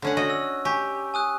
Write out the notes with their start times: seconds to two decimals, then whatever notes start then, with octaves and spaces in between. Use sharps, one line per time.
0.02 D3 C#4 F#5
0.17 F#4 D#5
0.30 E6
0.65 G4 G#5 C#6
1.14 G#5 D#6 F#6